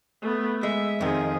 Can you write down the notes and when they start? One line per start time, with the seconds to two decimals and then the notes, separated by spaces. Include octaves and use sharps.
0.22 A3 B3
0.63 G#3 E5
1.01 F2 D#3 F3 G#4